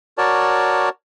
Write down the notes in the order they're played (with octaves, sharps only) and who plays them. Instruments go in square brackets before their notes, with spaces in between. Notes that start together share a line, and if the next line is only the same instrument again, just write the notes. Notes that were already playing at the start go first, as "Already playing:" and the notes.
[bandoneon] F#4 A#4 C#5 D5 A5